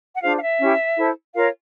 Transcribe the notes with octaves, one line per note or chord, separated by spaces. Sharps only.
F#5
D4 F4 G#4 C5 F5
F5
E5
C#4 E4 G4
E4 A4 C5
F4 A#4 C#5 F5